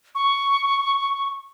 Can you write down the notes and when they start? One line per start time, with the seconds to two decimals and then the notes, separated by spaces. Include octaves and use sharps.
0.15 C#6